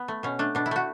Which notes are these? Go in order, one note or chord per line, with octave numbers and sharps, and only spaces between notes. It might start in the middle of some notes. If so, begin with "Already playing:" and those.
Already playing: B3
A3
B2 C#4
A3 D4
B2 D4
E4
A3 F#4